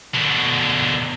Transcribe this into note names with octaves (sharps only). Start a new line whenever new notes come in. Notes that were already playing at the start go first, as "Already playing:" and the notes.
B2 D3